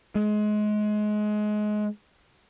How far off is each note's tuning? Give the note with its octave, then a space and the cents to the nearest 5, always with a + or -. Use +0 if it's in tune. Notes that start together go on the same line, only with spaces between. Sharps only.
G#3 +25